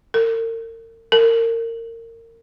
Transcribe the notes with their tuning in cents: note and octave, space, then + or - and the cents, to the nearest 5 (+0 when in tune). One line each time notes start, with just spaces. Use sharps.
A#4 -40
A#4 -25